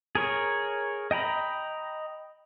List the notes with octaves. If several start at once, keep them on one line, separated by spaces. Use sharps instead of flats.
G#4 A#4 C#5
D#5 G5 A#5 B5